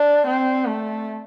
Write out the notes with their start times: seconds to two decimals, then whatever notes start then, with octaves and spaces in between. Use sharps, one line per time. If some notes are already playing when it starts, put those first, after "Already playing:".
Already playing: D4
0.27 C4
0.67 A3